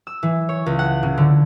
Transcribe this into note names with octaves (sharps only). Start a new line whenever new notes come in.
E6
E3
C#5
C#2
F#5
C#3
D3